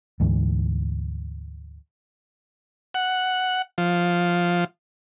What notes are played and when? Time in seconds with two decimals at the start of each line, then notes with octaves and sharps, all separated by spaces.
0.20 D2 G#2 E3
2.94 F#5
3.78 F3